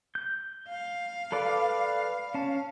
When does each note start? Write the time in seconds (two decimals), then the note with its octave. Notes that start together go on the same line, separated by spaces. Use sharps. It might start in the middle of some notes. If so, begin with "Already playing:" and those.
0.15 G6
0.68 F5
1.32 A4 B4 D5
2.34 C#4 A5